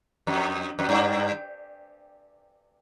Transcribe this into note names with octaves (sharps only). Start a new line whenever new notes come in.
F2
F2
G2